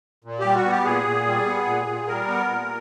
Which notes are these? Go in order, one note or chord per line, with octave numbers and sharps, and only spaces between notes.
A#2
G3 G4
F#4
B3
G4
A#2 G#4
A#2
G3
B3
A#2
A#2
G3 A#4
B3
A#2